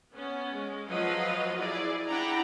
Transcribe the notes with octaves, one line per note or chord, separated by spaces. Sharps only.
B3 C#4
G#3
F3 F#3 B4 D#5 F5
E4 G#4 D5
D4 E4 F#5 G5 A#5